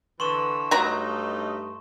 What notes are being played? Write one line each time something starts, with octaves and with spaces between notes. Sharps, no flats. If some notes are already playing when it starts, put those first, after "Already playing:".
D3 E3 C6 C#6 E7
G2 F#3 A3 D#4 A#5